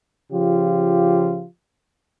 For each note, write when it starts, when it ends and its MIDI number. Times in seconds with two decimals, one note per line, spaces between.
0.32 1.45 49
0.32 1.45 53
0.32 1.45 65
0.32 1.45 67